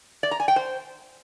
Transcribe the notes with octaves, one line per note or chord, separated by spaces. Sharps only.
D5
A#5
G#5
G5
C5